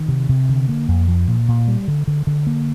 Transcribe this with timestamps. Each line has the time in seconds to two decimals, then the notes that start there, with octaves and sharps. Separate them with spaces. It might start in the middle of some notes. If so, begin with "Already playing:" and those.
Already playing: D#3
0.08 C3
0.29 C3
0.49 D3
0.69 A#3
0.88 F2
1.09 F3
1.28 A#2
1.48 A#2
1.68 G3
1.88 D3
2.08 D3
2.27 D3
2.47 A#3